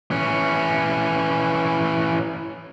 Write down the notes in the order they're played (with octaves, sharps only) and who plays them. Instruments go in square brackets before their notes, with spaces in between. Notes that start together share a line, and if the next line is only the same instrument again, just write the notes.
[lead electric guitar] E3 C#4